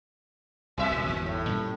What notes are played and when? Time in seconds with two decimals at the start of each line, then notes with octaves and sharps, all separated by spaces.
0.78 C2 A#2 E5
0.91 E1 C#2
1.09 G1 E2 G#2
1.26 A2
1.49 A#2 G3 C#4